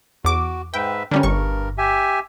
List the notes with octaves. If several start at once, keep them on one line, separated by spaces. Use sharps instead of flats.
E2 F#4 D6
G#2 B4 E5 G5
G2 D3 G3 C#4 A#4
G1 C#6
G4 E5 G#5